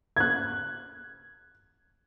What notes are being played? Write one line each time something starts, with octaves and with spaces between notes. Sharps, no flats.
F#6 G#6